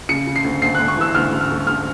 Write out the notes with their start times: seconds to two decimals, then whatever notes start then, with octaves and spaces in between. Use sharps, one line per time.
0.09 C#3 C#7
0.27 C#3
0.36 C7
0.44 D2
0.61 D2 C7
0.75 F#6
0.80 D2
0.88 C#6
0.97 E3 E6
1.14 D2 F6
1.32 D2
1.41 F6
1.50 D2
1.67 D2 F6